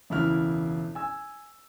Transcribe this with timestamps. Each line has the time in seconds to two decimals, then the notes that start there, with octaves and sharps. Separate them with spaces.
0.10 E1 C#2 E4 F6
0.95 G#5 E6